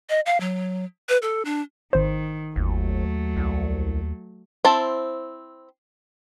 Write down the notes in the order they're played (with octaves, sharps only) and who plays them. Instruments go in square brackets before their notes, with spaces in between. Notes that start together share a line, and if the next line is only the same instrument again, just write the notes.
[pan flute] D#5
F5
F#3
B4
A4
D4
[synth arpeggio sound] G#1 C5 [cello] D#3
[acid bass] G1 [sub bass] D#2 [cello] F#3 A3
[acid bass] C2
[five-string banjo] C4 E4 C5 A5